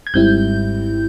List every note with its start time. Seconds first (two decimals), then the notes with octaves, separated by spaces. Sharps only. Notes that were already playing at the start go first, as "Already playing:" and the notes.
0.07 G#6
0.14 G#1 G#2 G3 C4 E4 G6